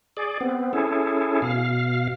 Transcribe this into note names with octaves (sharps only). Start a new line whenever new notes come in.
G#4 D5
B3 C4
C#4 E4 G#4 A4
B2 F5